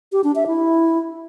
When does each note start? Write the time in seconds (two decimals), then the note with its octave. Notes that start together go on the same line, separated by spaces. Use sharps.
0.12 G4
0.24 D4
0.35 E5
0.47 E4